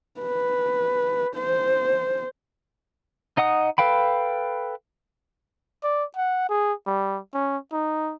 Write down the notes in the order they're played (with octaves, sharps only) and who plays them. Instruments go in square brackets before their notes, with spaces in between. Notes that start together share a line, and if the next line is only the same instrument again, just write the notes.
[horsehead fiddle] B4
C5
[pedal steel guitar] D#4 D#5 F#5 D#6
A4 B4 F5 G5 B5
[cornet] D5
F#5
G#4
G3
C#4
D#4